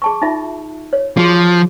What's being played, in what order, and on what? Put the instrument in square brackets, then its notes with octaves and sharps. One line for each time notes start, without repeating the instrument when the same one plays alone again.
[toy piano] G#4 A5 C#6
D#4 F4 E5
C#5
[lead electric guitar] F3 [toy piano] F#4 G#4